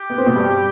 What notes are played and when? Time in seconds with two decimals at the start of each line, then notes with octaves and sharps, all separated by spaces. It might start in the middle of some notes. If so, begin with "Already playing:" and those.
Already playing: G4
0.10 B3
0.18 C4
0.26 B2 B3
0.36 G2 G3